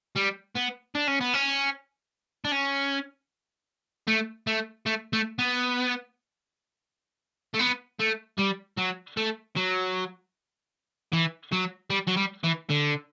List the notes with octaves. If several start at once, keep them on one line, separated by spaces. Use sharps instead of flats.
G3
B3
D4
C#4
B3
C#4
D4
C#4
A3
A3
A3
A3
B3
A3
B3
A3
G3
F#3
A3
F#3
E3
F#3
G3
F#3
G3
E3
D3